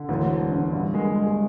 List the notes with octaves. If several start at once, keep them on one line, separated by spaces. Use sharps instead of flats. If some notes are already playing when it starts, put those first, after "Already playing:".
Already playing: D3
D2 E3 F#3
E1
D3
G2
G#3
G#3